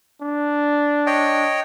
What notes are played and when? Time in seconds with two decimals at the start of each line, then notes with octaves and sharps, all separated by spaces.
0.22 D4
1.07 C#5 D#5 G5